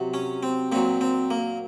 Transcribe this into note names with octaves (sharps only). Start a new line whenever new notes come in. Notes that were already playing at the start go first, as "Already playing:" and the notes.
Already playing: C3 F#3
C#4
C4
A#2 F#3 C4
C4
A#3